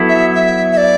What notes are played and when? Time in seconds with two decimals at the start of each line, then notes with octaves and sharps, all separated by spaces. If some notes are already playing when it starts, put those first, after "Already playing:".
Already playing: F#3 B3 E4 A4
0.09 E5
0.34 E5
0.72 E5
0.77 D5